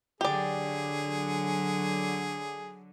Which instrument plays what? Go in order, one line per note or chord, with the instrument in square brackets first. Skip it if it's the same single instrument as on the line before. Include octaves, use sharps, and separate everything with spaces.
[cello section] D3 F#3 [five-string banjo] G4 D5 [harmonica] G#4